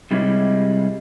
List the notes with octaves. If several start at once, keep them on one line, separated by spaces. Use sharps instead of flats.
C3 G3 G#3 C#4 E4